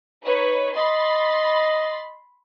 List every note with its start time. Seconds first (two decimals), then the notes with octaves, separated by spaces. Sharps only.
0.24 D#4 B4 C#5
0.77 D#5 B5 C6 A6